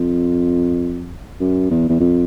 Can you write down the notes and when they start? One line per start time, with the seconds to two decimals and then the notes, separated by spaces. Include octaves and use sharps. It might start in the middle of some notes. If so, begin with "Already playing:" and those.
Already playing: F2
1.40 F#2
1.70 E2
1.89 E2
2.00 F2